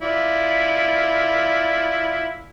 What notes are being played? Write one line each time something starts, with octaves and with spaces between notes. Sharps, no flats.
E4 F4 D5